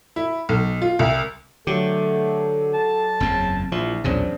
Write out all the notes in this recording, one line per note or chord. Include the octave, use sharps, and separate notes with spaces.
E4
B1
F4
C2
D3 F#3 A3 G4 A4
A5
F#1 E2 C#3 C4
A#1 F3 E4
B1 E2 A#2 C#3 C4 D4